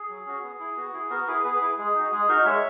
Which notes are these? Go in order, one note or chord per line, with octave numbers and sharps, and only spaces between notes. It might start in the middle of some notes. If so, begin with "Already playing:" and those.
Already playing: G#4
F#3
C#4 F#4
B3
E4
B3 F#4
E4 G#4
B3 F#4 A#4
E4 G#4 B4
B3 G#4 B4
G#4 B4
E4
G#3 G#4
D#4 F#4
G#3 G#4
D#4 F#4 A#4
G#3 C#5 E5